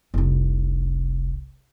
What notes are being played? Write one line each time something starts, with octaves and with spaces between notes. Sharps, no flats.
F1 C2